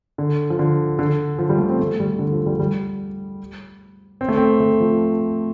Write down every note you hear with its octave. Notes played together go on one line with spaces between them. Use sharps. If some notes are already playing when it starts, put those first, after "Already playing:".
D3
F3
D3
D3
F3
G3
A3
C4
A3
G3
D3
F3
G3
G3
C4
A3
C4
A3
F3